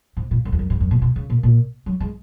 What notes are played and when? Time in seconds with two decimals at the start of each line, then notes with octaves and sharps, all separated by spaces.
0.17 G#2
0.31 A#2
0.45 F#2
0.52 F2
0.59 F#2
0.70 G#2
0.80 F#2
0.91 A#2
1.02 B2
1.16 C#3
1.30 A#2
1.43 A#2
1.86 F#3
2.00 G#3